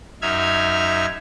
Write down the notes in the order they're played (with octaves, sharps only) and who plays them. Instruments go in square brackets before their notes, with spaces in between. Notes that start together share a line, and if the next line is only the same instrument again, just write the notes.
[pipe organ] F#2 D#4 E5 F6 G#6